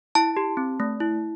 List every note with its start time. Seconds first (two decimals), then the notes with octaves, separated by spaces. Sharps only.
0.15 E4 A5
0.37 G4
0.57 C4
0.80 A3
1.00 E4